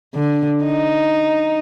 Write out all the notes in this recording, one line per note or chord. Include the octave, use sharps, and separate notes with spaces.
D3
D#4